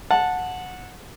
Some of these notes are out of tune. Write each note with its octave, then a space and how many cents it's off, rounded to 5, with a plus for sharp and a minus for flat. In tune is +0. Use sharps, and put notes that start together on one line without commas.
F#5 -15 A5 +0